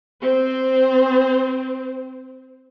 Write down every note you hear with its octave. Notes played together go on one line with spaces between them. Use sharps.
C4 C5